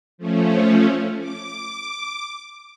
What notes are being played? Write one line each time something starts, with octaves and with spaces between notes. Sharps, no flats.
F3 A3 C#4
D6